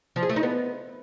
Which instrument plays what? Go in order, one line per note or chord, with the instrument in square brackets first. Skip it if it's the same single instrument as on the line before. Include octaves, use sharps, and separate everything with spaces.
[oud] F3
G#4
A3
D#4
B3